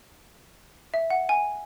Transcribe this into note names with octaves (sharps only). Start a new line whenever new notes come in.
E5
F#5
G#5